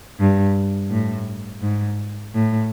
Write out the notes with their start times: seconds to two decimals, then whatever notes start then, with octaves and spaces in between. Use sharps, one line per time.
0.20 G2
0.91 A2
1.62 G#2
2.34 A2